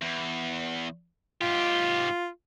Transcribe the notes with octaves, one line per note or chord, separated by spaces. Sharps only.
E2
G#2 F4 G4